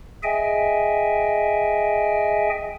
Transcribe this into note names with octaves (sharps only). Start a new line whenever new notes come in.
G#4 D#5 E5 G5 G#5